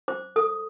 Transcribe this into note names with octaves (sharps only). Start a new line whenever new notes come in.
C5 D6
A4 D#6